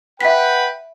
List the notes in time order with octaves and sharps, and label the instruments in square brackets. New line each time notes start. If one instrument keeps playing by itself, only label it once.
[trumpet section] B4 F#5 G5 [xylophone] E5 B6